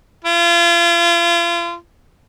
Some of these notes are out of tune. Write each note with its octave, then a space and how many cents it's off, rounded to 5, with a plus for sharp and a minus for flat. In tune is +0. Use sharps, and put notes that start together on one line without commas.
F4 -35